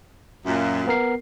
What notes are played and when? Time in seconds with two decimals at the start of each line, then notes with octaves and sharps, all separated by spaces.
0.46 F#2 A#2
0.87 B3 A#4 C7